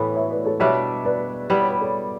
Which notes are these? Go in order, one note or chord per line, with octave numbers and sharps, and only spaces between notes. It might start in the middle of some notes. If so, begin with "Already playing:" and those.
Already playing: A2 E3 B3 A4 C#5
C#5 E5
B4 D5
A4 C#5
B2 G3 D4 C#5 E5
B4 D5
G3 B3 E4 D5
C#5
B4
A4 C#5